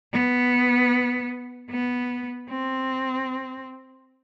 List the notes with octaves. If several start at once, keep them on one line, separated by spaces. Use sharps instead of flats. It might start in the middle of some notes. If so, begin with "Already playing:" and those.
B3
B3
C4